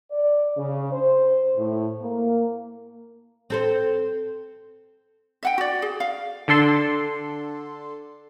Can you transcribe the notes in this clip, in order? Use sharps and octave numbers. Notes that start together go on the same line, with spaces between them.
D5
C#3
C5
A2
A#3
C4 A4 C5
E5 F#5 G5
F#4 D5
G#4
F5
D3 D4 A4 C6